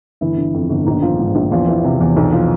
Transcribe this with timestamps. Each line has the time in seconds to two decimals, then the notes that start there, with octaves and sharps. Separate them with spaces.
0.21 G1 E3 E4
0.37 D3
0.54 F2
0.69 G1
0.86 A#1 D#3 D#4
1.02 F3
1.19 G#2
1.35 A#1
1.51 E2 F3 F4
1.67 E3
1.84 C3
2.01 E2
2.16 B1
2.33 F3